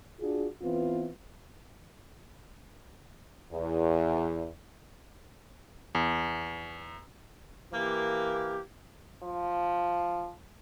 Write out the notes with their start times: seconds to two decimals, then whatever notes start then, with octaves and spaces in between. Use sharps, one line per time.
0.21 D4 F4 F#4 G#4
0.62 E3 B3 C4 F4
3.52 E2
5.95 E2
7.73 E3 A#3 G4
9.23 F3